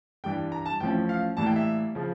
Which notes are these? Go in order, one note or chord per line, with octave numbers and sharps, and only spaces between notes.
G2 E3 G3 D4 G5
A#5
A5
A1 A2 F3 C#4 G5
F5
A2 E3 G3 A#3 A5
G5
E5
C#3 F3